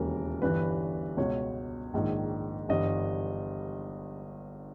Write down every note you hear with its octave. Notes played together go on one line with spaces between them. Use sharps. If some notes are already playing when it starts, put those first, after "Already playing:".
Already playing: E1 D#2 C#3 E3 A#4
G1 G2 E3 B4
C#2 B2 C#5
A#1 G#2 D#3
G1 G2 E3 D#5